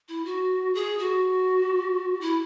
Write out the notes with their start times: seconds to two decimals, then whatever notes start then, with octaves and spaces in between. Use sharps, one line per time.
0.09 E4
0.25 F#4
0.75 G#4
0.99 F#4
2.21 E4